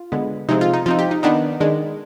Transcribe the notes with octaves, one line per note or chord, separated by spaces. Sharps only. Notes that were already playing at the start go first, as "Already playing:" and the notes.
Already playing: F4
D3 G#3 B3
C3 F3 G#3 C4 D#4
F4
D#4
F3 C4 D#4 F4
G4
D#4
D#3 B3 D4 D#4
D#3 G#3 D4